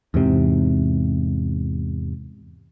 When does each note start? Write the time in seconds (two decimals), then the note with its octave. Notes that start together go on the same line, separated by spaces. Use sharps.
0.14 E2 G#2 C3